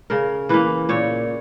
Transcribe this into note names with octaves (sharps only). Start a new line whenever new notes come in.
C#3 A#4
E3 A#3 B4
A#2 C#5